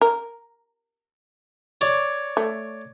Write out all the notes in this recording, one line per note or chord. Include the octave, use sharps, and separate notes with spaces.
A#4
C#5 D5 C#6
A3